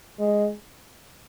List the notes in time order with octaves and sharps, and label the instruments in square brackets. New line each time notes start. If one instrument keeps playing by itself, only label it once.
[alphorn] G#3